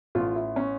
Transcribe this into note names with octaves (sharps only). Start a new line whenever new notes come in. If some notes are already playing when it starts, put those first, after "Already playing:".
A1 F4
E4
C#4